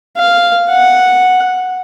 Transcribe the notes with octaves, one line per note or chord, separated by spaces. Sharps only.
F5
F#5